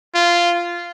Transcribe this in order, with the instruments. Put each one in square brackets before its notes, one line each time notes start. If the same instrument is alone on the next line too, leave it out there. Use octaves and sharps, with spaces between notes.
[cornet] F4